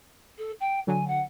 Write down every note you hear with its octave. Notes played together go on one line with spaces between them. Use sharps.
A4
G5
D3 F#3 G#5
F#5